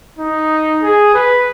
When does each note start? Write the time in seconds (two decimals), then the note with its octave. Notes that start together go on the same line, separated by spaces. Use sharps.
0.19 D#4
0.83 G#4
1.14 B4